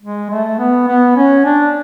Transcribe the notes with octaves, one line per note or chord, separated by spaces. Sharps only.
G#3
A3
B3
B3
C#4
D4